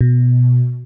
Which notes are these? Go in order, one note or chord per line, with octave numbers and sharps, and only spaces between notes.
B2